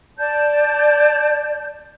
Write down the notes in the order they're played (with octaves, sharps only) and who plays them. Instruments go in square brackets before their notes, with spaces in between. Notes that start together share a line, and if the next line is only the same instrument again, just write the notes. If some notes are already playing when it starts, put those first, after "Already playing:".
[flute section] D5 A5 G6